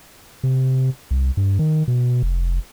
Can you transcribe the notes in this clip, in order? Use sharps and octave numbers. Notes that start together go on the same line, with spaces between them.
C3
C2
G2
D#3
B2
F1